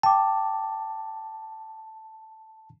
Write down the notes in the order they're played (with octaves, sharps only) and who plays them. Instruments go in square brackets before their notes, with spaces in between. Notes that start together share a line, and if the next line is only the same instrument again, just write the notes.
[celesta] G5 D6 [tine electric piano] A5